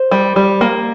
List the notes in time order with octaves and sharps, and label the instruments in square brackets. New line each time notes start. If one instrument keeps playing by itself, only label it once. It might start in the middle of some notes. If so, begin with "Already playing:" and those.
Already playing: [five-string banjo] C5
G3
G3
A#3